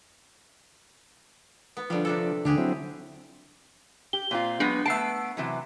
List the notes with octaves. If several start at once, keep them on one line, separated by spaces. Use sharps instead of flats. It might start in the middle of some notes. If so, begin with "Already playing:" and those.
B3
D3 F3 G3
C3 D4 A4
D2 D3 D4 G4 G#4
F#3 C4 E4
G4 G7
A#2 C4 F4
F#3 G#3 B3 D4
A3 B3 A5 E6 C7 D7
C3 E3 F#3